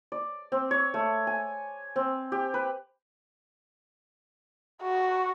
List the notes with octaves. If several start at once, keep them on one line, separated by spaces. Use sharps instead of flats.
D5
C4
C#5
A3
G#5
C4
G4
B4
F#4